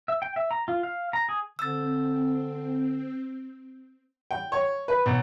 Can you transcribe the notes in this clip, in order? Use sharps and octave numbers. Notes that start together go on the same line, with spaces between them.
E5
G5
E5
A#5
F4
F5
A#5
G#4
D3 C4 E6 A6
G5
C#5
B4
B1